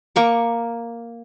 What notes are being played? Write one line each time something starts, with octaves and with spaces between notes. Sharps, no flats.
A#3 C#6 D6